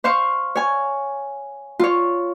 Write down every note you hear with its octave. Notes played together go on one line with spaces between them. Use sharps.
C5 F5 C6 C#6
C#5 G#5
F4 C#5